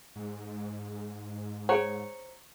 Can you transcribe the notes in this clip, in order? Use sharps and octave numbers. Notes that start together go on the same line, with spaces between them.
G#2
G#4 C5 C#5 F#5 A#5 C#7